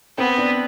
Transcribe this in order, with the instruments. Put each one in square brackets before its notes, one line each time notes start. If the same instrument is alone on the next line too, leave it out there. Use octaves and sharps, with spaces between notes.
[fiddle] B3 [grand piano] C4
[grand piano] D4